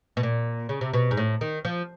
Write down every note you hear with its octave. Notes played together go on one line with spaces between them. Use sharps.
B2
A#2
C#3
C3
B2
G#2
A2
D#3
F3